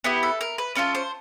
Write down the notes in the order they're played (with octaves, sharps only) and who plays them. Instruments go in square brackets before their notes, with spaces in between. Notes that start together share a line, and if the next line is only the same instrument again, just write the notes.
[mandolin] B3 E4 G4
A4
A#4
B4
C#4 F4 A4 B4
C5